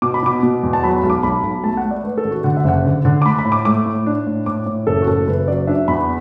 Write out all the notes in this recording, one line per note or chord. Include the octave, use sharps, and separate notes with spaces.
B2 D6
B5
B2 D6
B2
E2
A5
F#3 B5
B5
B1
D6
B1 B5
B1
A3 A5
F#5
A3
D5
A3 B4
A4
A1
F#4
D3 F#5
E5
F#1 F#5
D3
D3
D6
A3 B5
B5
A2
D6
A3 D6
A2
D4
A2
A2 D6
A2
F#1 A4
F#4
F#2 A4
F#1 B4
F#3 D5
D4 E5
E2 B5